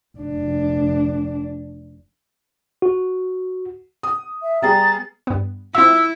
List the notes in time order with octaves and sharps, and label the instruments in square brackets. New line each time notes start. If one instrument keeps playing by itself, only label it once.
[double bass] F1 D4
[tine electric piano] F#4
[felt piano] D#6
[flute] E5
[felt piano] G3 B3 G#4 [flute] A#5 [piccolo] A6
[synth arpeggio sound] G2 B3
[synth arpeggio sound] C4 F4 E5 [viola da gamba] E4 [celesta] E6